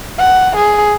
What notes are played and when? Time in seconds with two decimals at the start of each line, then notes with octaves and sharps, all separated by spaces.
0.19 F#5
0.57 G#4